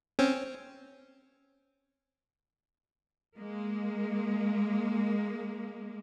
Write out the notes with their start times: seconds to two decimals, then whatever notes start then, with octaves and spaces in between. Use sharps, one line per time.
0.19 C4 C#4
3.36 G#3 A#3